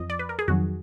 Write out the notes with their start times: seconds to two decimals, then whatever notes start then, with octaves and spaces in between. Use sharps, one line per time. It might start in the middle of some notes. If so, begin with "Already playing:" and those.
Already playing: F2 F3 D#5
0.10 D5
0.19 B4
0.29 A#4
0.39 G#4
0.48 F2 D#3 F#3 F#4